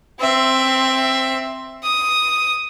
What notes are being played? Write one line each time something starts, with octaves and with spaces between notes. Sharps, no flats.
C4 E5
D#6